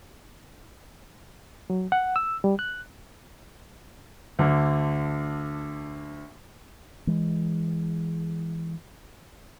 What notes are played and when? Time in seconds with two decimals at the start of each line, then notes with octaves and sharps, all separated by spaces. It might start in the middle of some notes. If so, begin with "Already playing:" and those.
1.70 F#3
1.92 F#5
2.16 E6
2.44 G3
2.59 F#6
4.39 D2 D3
7.07 E3 G#3